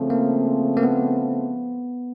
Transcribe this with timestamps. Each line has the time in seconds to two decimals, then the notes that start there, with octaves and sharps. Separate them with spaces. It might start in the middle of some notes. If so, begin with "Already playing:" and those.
Already playing: C#3 F3 A3 C4
0.10 A#3
0.77 A#3
0.83 B3